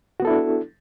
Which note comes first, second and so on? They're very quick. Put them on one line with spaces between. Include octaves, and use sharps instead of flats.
F#4 B3 A4 E4 D4